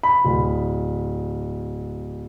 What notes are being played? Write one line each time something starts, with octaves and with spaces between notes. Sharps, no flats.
B5
D1